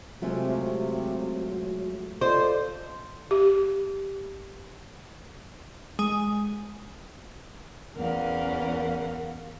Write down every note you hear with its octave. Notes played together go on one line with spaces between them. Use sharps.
C3 F#3 G#3 A3 F4
F4 A4 C5 D5 D#5
G4
G#3
E2 C#4 A#4 F5 F#5